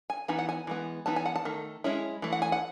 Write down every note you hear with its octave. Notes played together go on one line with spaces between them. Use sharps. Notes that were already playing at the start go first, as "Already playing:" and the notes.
G#5
E3 B3 D#4 G#5
F#5
G#5
E3 G#3 B3
E3 B3 D#4 A5
G#5
F#5
A5
D#3 A3
G#3 C#4 E4
E3 A3
F#5
G#5
F#5